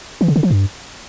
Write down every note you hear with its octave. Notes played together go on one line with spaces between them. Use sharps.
E3
C#3
D3
F3
G2